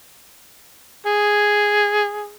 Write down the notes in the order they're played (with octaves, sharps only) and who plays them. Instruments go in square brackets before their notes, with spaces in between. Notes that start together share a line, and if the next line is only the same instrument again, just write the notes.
[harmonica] G#4